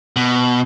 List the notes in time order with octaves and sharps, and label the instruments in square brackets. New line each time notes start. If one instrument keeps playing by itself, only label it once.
[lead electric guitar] B2